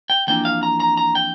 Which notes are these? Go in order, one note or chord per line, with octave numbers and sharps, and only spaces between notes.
G5
F2 E3 A#3 D4 G5
F5
A#5
A#5
A#5
G5